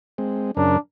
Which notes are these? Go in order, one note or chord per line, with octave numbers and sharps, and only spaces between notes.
G#3 C4
F#2 C#3 D4 A#4